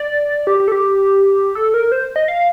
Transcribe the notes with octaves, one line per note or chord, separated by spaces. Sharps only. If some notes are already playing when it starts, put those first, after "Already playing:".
Already playing: D5
G4
G4
A4
G4
A4
A#4
C5
D#5
F5